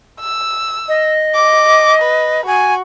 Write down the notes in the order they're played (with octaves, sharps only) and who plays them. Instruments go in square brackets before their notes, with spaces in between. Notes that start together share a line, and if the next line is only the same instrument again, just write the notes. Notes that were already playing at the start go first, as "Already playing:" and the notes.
[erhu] E6
[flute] D#5
[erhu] D6
B4
[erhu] F#4 [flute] G#5